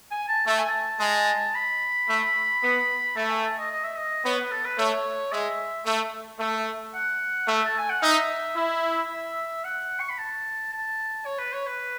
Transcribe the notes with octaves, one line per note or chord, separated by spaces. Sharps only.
G#5
A5
A3 A5
G#5
A5
G#3
B5
A3
B3
A3 A5
G#5
A5
D#5
D#5
E5
D#5
B3 C#5
B4
A4
B4
A3 C#5
G#3 E5
A3
A3
F#5
A3 E5
A5
G#5
F#5
D#4 E5
E4
F#5
C#6
B5
A5
A5
C#5
B4
C#5
B4